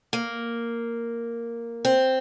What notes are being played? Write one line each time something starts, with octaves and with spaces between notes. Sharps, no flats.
A#3
C4